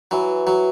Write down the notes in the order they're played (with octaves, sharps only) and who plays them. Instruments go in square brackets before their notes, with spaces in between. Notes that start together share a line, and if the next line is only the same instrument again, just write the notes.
[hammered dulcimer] E3 [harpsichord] F#3
[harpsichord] F#3